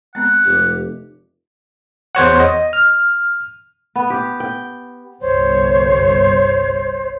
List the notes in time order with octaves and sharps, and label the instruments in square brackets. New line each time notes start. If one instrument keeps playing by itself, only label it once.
[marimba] G#3 B3 C4 [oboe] F#5
[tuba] F1 [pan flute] G4
[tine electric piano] E2 C5 C#5 F#5
D#5
F6
[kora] B3
G4
G5
[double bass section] G1 C2 [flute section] C5 C#5